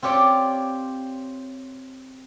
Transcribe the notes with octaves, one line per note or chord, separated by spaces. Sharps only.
C4 F4 G4 C#5 D5